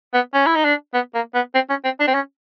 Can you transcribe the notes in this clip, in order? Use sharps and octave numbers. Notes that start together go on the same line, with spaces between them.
B3
C#4
E4
D#4
D4
B3
A#3
B3
C4
C#4
C4
D4
C4
C#4